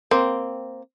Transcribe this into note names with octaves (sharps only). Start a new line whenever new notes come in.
A#3 C4